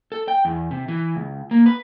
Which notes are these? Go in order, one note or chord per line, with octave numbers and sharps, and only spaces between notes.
A4
G5
E2
C3
E3
C#2
A#3
B4